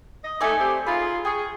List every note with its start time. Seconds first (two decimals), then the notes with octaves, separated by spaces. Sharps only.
0.24 D#5
0.41 A3 D#4 D5 E5 G#5
0.59 A3 C4 G4
0.87 D#4 F4 G#4 B5
1.25 G#4 G5 C#6